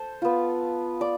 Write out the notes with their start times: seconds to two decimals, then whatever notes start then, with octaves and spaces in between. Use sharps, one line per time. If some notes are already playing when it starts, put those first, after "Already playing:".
Already playing: A4 C5
0.22 B3 F4
1.01 D5